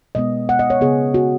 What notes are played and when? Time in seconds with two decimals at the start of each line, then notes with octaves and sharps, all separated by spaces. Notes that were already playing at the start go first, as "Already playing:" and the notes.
0.15 B2 G#3 B3 D#5
0.49 F#5
0.59 D#5
0.70 C#5
0.81 C#3 B3 G#4
1.14 F#4